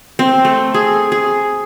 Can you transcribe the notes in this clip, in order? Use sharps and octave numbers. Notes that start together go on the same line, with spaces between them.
C4
A3
G#4
G#4